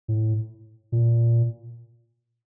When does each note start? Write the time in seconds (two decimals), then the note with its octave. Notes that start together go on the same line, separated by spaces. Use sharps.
0.08 A2
0.92 A#2